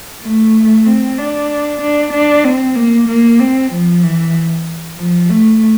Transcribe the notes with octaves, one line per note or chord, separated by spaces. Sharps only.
A3
C4
D4
D4
D4
C4
A#3
A#3
C4
F3
E3
F3
A3